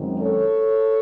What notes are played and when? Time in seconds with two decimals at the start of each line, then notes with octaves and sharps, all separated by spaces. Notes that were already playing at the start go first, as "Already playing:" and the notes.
Already playing: F#2 D#3 G#3 C4
0.20 A4 C#5